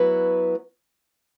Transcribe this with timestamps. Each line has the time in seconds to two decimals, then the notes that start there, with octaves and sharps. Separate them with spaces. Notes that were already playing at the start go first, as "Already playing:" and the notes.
Already playing: F#3 B3 E4 B4